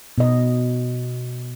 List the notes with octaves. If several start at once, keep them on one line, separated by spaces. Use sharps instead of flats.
B2 D#5